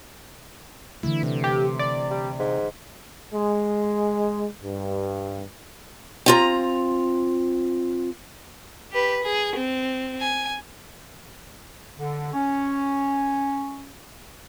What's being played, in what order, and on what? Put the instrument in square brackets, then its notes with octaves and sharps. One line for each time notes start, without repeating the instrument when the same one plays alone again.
[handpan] D3 E3 A3 [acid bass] E4
[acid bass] C3
[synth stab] G4
D5
[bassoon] G3
G#2
[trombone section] G#3
G2
[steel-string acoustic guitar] C4 F4 A#5
[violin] G4 B4
G#4
C4
G#5
[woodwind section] D3
C#4